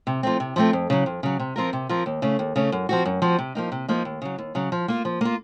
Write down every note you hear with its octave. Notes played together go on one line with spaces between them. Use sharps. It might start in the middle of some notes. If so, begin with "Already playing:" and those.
C3
F3 A3 C4
C3
F3 A3 C4
F2
C#3 F#3
F2
C#3 F#3
C3
F3 C4 F4 A#4
C3
F3 C4 F4 A#4
D#2
C#3 A3 C#4
D#2
C#3 A3 C#4
F#2
F3 C4 F#4
F#2
F3 C4 F#4
C3
F3 A#3 D#4
C3
F3 A#3 D#4
D#2
C#3 F#3
D#2
C#3 F#3
F3
A#3 F4
F3
A#3 F4